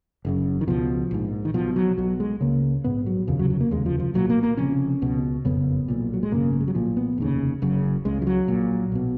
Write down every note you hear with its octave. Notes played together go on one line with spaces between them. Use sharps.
F#1 F#2 C#3
D#3
C#2 B2 F3
A#1 G#2
D#3
B1 B2 F3
F#3
B1 B2 F#3
G#3
C#2 C#3 A#3
A#1 G#2 B3
F#3
F1 D#2 C#3 F3
F#3
F#3
A#3
F1 D#2 C#3 G#3
F3
F3
B1 A#2 F#3
A#3
A#3
F1 F2 C#3 C#4
C#2 B2
F#1 F2 C#3 B3
B1 A#2
F#3
G#3
G#1 F#2 C#3 A#3
A#3
G#3
F#3
B1 A#2 F3
B3
F1 D#2 C#3
F#1 F#2 C#3
C#2 C#3 G#3
F3
F#3
A#1 A#2
B1 B2